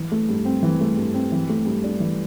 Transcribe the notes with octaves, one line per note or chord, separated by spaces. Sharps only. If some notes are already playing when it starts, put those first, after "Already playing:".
Already playing: E3
A3
G2
C4
E3
A3
G2
C4
E3
A3
G2
D4
E3